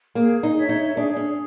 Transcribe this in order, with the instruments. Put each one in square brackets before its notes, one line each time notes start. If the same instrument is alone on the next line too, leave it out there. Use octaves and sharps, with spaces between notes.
[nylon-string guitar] A#3 [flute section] G#4
[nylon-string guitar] D#4
[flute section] C#5 E5
[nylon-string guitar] D#4
[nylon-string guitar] D4 [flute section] G#4
[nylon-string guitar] C#4